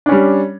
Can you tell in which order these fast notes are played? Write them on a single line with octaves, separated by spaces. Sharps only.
D4 C#4 G3